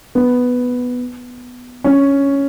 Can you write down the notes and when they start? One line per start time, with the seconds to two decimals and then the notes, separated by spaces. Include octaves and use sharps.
0.15 B3
1.84 C#4